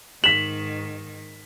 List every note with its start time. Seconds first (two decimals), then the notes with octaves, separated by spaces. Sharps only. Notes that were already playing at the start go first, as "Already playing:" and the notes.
0.24 G#2 D#3 B6 E7 F#7